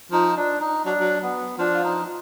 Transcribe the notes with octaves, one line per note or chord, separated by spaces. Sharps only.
F3 D#4
D4
D#4
F#3 D4
F#3
B3
F3 D4
F4
D#4